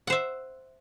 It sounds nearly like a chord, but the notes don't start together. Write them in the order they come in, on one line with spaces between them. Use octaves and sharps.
F#5 C5 E5